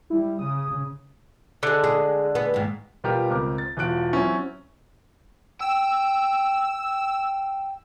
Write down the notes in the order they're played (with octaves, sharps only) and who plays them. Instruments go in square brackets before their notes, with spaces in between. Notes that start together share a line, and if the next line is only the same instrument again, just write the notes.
[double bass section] G3 [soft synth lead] E4
[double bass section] C#3 [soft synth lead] D#6
[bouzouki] D3 G#3
[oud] G#4
B3
D#2 G#2
[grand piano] B2 G3 B3 F4 G4 A#4
C#2 C4 A#4 D6
A6
E1 F4 F#4 F#6 D7
F#3 C4 C#4 E4
[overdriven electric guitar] G5 [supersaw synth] E6